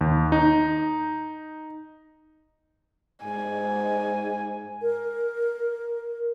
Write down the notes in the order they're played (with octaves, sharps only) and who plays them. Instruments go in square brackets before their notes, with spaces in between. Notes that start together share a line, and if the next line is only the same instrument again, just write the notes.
[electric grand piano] D#2
D#4
[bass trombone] G#2 [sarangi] G#5
[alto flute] A#4